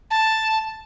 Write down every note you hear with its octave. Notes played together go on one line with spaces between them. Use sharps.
A5